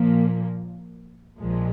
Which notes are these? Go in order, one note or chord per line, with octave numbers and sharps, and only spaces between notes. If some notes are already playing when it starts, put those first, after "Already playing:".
Already playing: A#2 F3 A#3
A#1 A#2 F3 G#3